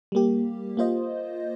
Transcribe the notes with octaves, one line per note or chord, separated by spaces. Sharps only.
G3 A#3 G4
A#3 F4 C5 D#5